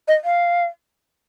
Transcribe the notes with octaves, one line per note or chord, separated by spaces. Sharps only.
D#5
F5